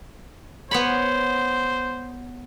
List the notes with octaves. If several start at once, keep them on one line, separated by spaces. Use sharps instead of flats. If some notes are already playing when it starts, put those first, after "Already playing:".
B3 C5 C#5 B5